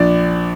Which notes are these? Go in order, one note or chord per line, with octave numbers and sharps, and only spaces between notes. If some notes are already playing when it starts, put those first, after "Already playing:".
Already playing: A#1 D4 D5